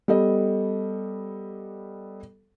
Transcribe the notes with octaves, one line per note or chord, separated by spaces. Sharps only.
G3 B3 A4 D#5